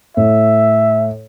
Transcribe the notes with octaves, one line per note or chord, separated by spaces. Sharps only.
A2 E5